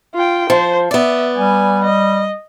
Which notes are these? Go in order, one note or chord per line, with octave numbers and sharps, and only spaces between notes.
F4 G5
F3 C5
B3 D5 E5
G3 G#5
D#5